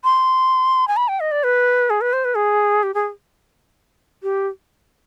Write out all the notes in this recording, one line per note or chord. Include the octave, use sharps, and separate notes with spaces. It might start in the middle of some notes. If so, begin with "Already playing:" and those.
C6
G#5
B5
G5
D#5
D5
B4
G#4
B4
C5
B4
G#4
G4
G#4
G4